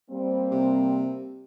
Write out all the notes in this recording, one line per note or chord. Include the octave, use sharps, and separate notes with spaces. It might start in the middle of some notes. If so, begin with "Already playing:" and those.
G3 A#3 C4
C3